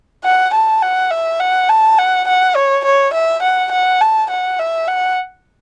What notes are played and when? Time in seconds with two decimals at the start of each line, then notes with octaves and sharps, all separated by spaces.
0.24 F#5
0.54 A5
0.82 F#5
1.11 E5
1.40 F#5
1.69 A5
1.98 F#5
2.28 F#5
2.56 C#5
2.85 C#5
3.14 E5
3.42 F#5
3.72 F#5
4.01 A5
4.30 F#5
4.59 E5
4.88 F#5